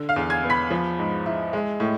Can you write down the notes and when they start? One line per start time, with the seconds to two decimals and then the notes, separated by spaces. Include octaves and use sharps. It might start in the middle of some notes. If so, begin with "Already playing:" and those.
Already playing: D3
0.09 F5 F6
0.16 E2
0.30 G#5 G#6
0.44 B3
0.50 B5 B6
0.70 F3
0.99 G#2
1.26 E4
1.53 G#3
1.80 A2